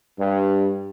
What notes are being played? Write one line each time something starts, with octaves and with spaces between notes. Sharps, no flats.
G2